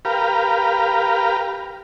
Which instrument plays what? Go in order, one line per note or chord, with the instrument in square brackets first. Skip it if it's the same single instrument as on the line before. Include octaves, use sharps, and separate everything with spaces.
[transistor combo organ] G4 A#4 B4 F5